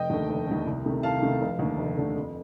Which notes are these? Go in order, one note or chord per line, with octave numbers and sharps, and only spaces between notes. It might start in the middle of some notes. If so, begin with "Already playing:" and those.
Already playing: F1 D#5 G5
D#2 D3 A3
F1
D#2 D3 A3
C2
C3 D#3 A3
C2 F5 A5
C3 D#3 A3
F1
D#2 D3 A3
F1
D#2 D3 A3
F2